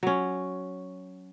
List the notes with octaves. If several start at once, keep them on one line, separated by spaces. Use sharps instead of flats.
F#3 C#4